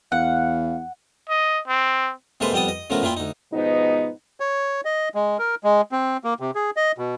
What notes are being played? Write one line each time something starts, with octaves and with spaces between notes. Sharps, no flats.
E2 F5 F#5
D#5
C4
C3 G#3 A#3 A4 B4 C5
F2 G3 B3 G5 A5 D#6
D#5
C#3 F3 A3 B3 A#4
A#2 A#3 E4 F4 G5
D2 D#4
G#2 B2 F3 B3 D#4
C#5
D#5
G#3
A#4
G#3
C4
A#3
C3
G#4
D#5
B2